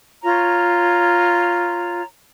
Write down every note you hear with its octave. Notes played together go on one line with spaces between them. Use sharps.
F4 C#5 A#5